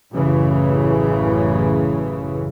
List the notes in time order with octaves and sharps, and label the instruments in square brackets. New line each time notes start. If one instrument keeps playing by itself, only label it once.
[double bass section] A1 F#2 C#3 E3